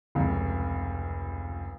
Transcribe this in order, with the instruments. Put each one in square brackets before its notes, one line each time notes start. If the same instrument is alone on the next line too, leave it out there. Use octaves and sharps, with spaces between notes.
[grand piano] F1 C#2